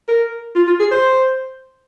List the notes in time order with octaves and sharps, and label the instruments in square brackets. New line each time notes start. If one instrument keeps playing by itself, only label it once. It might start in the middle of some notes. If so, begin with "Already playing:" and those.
[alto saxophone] A#4
F4
F4
G#4
C5